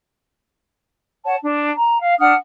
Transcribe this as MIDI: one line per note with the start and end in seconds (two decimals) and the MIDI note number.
1.24 1.35 73
1.24 1.35 78
1.24 1.35 81
1.41 1.72 62
1.75 1.99 82
2.00 2.13 77
2.19 2.33 62
2.19 2.33 78
2.19 2.33 87
2.19 2.33 89